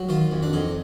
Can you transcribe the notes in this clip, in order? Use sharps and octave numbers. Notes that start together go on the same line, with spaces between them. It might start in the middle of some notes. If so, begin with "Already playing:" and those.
Already playing: F#3
D#3 F4
F2
D4
F2 D#4